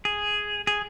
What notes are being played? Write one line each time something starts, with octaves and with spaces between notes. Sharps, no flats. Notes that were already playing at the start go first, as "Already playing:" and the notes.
G#4
G#4